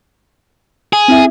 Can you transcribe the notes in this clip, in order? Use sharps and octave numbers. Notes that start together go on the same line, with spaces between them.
G#4
C4 E4 E5